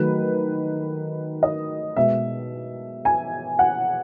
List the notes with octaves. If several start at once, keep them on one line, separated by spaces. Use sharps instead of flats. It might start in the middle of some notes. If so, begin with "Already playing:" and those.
Already playing: D#3 F#3 A3 B4
D#5
B2 G#3 E5
G#5
F#5